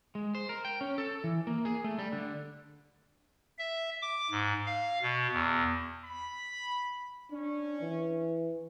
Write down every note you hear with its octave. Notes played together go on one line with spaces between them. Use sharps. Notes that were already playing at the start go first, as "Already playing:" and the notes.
G#3
C5
A#4
G5
C#4
A4
E3
A#3
G#4
A3
G3
D3
E5
D6
G#2
F5
B2
E2
B5
C#4 D4
E3